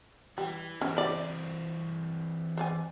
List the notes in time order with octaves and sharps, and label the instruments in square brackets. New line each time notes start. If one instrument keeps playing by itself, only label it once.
[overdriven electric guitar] E3 [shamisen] G3
[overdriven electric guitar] E3 C4 [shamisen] C#4
[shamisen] E4 D5
C5 D5 G#5